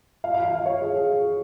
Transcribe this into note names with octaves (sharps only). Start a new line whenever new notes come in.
F5
F5
F5
F5
C#5
G#4
G#4